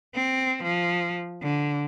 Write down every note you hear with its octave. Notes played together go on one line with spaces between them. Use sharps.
C4
F3
D3